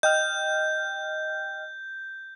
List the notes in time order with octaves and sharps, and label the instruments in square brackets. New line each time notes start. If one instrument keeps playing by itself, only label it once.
[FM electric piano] D#5 G5 F6 [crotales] G6